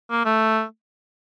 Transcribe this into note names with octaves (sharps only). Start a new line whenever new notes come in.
A#3
A3